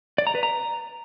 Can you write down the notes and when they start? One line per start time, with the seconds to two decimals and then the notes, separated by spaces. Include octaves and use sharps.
0.18 D5
0.27 A#5
0.35 B4
0.43 A#5